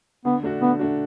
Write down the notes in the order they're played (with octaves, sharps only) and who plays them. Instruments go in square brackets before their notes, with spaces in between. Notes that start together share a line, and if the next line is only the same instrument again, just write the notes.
[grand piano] D3 [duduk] B3
[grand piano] A3 D4 F#4
[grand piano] D3 [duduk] B3
[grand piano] A3 D4 F#4